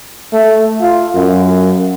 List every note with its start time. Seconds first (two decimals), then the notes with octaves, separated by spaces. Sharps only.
0.33 A3
0.81 F4
1.15 F#2